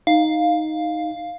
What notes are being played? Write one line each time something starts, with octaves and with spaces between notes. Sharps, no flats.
D#4 F5